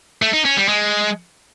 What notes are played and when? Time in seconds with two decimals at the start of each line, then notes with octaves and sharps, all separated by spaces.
0.22 A3
0.34 D#4
0.45 C#4
0.57 G3
0.68 G#3